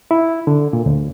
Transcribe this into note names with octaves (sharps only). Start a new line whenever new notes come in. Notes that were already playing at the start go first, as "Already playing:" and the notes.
E4
D3
A#2
D2